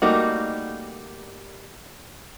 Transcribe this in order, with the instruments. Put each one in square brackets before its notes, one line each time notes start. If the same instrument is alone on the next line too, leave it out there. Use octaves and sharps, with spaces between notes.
[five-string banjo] G3 A3 A#3 D#4 F#4